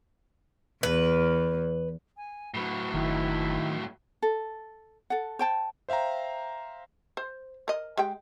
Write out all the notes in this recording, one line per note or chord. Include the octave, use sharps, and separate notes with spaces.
E2 B4
G#5
A2 F#3 B4
F#1 D#3 E4
A4
A4 F#5
C5 G5 A5
C5 E5 F5 G5 A#5
C5
A#4 D#5
G#3 G4 G5